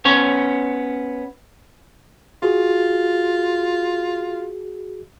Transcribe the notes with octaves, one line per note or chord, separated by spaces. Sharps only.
B3 C#4 C#5
F4 F#4 G#4